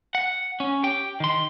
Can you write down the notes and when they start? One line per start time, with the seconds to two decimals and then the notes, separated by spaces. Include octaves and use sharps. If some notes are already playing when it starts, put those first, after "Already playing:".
0.15 F#5
0.60 C#4
0.83 G4 G5
1.20 D#3 C6